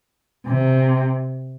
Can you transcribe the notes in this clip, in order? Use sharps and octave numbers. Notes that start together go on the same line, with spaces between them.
C3